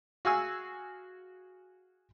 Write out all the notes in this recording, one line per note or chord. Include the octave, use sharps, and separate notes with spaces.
F#4 G#4 F5 G#5 C#6 E6